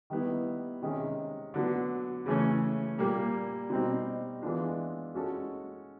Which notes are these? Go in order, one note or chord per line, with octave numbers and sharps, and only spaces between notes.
D#3 G3 B3 E4
C3 D#3 G#3 C#4
D3 F#3 B3
C#3 E3 A3 C#4
A#2 G3 A#3
B2 G3 C4 D#4
E3 G#3 B3 D4 F4
G#3 C#4 F#4 A4